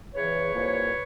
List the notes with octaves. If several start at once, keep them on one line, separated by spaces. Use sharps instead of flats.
E2 C#3 E3 B4 C#5
C2 A#2 F3 A#3